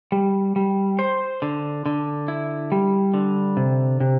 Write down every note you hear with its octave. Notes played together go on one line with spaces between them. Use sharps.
G3
G3
C5
D3
D3
E4
G3
D3
C3
C3